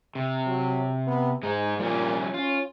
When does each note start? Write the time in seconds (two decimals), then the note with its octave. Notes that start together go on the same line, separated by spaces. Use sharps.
0.15 C3
0.47 F#3
1.07 B3
1.43 G#2 G#3 D#4
1.79 A#2 F3 G3 C#4
2.34 C#4 F4